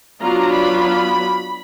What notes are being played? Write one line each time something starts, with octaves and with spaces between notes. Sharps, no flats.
F#3 B3 D4 F4 A#5
B5